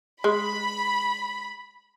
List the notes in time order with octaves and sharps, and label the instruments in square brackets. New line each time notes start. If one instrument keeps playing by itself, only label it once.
[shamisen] G#3 [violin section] B5